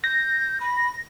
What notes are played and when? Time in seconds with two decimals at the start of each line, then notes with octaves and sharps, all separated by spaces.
0.04 G6 A#6
0.60 B5